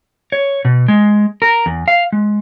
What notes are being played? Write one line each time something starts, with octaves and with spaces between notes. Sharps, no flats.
C#5
B2
G#3
A#4
E2
F5
G#3